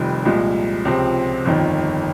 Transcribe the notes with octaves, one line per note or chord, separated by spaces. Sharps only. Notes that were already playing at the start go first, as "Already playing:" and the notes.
Already playing: F1 F2 D#3 G3
C2 A#2 F3 G#3
C#2 C3 F3 C4
G1 F2 D#3